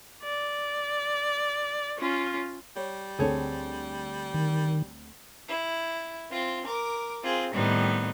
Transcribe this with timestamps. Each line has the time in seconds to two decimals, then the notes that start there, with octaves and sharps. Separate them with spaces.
0.23 D5
1.98 C#4 F4
2.76 G3 C#5
3.19 D2 C4 G#4 A4 C#5
4.34 D#3
5.48 E4
6.31 C4 F4
6.66 A#4 D6
7.23 C4 F4 G#4
7.54 A2 D#3 G3 B3 C4 D#4